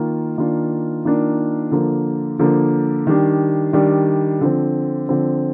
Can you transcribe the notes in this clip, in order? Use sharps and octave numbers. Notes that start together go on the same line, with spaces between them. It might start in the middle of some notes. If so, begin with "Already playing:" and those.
Already playing: D#3 A#3 F4
D#3 A#3 D4 F4
D#3 A#3 D4 F4
D3 F3 A#3
D3 F3 A#3
D#3 G3 D4
D#3 G3 D4
D3 F3 C4
D3 F3 C4